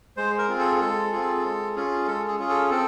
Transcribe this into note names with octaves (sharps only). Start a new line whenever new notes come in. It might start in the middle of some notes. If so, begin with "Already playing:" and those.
G#3 C5
A#4
C4 F4 G#4
A4
G#3 A4
C4 F4 G#4
G#3
C#4 F4 G#4
G#3 A4
G#4
C#4 F4 G#4
A4
C4 A4